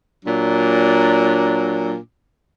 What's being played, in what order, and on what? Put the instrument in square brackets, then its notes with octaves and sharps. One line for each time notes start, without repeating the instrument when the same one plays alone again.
[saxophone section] A#2 F#3 D4